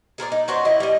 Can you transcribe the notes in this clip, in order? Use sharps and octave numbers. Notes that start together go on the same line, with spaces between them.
G#4 A#4 C5 D5
D#4
C#4 F#4 C5 D5
E4 D#5
G3 D#5